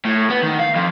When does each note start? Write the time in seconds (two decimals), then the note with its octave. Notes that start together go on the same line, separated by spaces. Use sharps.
0.05 A2
0.30 B3
0.43 D#3
0.59 F5
0.75 F2